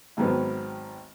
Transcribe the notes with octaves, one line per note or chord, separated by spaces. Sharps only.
G#1 D#3 F#3 B3 C5